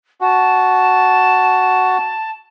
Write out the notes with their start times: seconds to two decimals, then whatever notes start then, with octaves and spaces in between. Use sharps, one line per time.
0.21 F#4 A5